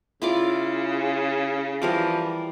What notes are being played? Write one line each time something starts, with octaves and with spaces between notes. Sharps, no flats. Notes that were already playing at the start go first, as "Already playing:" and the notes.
C#3 E4 F4 D5
E3 F3 G3 A#4